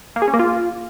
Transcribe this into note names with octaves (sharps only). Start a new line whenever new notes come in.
A#3
G#4
C#4
A#3
F4